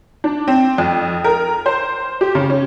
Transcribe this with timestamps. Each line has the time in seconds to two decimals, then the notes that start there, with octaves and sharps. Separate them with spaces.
0.24 D4
0.48 C4
0.78 F2
1.24 A#4
1.66 C5
2.21 G4
2.35 C#3
2.50 C#4